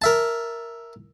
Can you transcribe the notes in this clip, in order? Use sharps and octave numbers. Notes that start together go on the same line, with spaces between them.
A#4 E5 A5